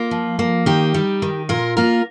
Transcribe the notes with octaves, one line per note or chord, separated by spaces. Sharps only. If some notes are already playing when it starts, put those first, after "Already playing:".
Already playing: A#3 F4
F3
A#3
D#3 D#4 G4
G3
D#3
A#2 F4 A#4
A#3 F4 A#4